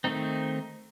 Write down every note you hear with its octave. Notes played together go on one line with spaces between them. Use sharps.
D#3 A3 C4 D#4